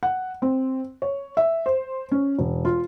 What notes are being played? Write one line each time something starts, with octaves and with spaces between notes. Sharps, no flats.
F#5
C4
C#5
E5
C5
C#4
E1
F4